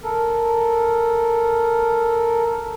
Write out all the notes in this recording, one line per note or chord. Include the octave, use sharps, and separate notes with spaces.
A4 A#4